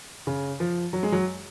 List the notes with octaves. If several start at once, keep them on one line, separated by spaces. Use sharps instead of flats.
C#3
F3
F#3
G#3
F#3